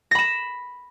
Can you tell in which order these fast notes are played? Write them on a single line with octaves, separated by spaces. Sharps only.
A#6 B5 E7